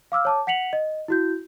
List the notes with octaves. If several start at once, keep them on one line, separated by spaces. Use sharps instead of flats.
F5 D6 E6 F6
C#5 A5 D6
F#5 B6 C#7 F7 F#7
D#5
E4 F#4 G6